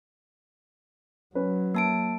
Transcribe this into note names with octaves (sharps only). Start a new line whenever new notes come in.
F#3 C#4 B4
A#3 A5 D7